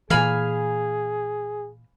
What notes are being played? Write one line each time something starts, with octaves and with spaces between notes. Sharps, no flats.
A#2 E3 G#4 F5 G#5 B5